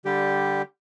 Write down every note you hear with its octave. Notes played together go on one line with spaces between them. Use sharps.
D3 G3 G4